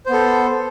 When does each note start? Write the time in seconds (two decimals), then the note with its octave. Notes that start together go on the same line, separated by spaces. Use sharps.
0.06 C5
0.10 B3
0.13 A4